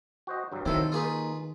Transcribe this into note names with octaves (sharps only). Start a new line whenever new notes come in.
F#4 C5 D#5
G2 F#3 G3
C3 D#3 F#3 C4 E4 A4
D#2 A#3 D#4 F4 G#4 B4